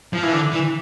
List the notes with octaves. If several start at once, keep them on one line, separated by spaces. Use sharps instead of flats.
F3
E3
D3
E3